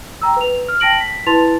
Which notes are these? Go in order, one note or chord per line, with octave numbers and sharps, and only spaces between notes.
G5 A#5 E6
B4 F7
F6
G5 A5 A#6 D7 F#7
B6
E4 B4 A5 C6 A6 F7